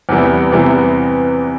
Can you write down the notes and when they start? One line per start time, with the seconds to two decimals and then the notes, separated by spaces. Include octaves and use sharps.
0.09 E2 C3 E3 G3 B3
0.52 E2 C3 E3 G3 B3